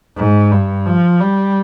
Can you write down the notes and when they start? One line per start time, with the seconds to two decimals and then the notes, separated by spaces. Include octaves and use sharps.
0.17 G#2
0.51 G2
0.86 F3
1.21 G3